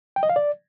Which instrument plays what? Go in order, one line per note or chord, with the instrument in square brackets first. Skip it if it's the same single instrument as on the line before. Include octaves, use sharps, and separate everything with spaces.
[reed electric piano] G5
D#5
F5
D5